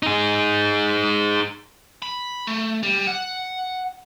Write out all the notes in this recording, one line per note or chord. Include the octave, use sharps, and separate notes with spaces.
D#4 G#4
B5
A3
G3
F#5